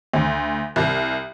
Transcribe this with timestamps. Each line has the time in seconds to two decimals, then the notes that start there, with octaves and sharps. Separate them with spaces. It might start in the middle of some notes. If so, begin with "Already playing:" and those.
0.13 D2
0.76 C2